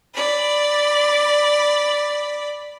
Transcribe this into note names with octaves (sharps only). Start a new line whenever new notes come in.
D5 B5